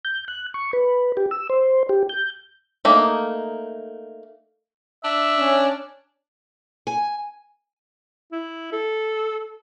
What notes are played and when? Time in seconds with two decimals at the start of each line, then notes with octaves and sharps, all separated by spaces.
0.05 G6
0.28 F#6
0.54 C#6
0.73 B4
1.17 G4
1.31 E6
1.50 C5
1.89 G4
2.09 G6
2.85 A3 A#3 D#4
5.04 D4 E5
5.38 C#4
6.87 G#5
8.32 E4
8.72 A4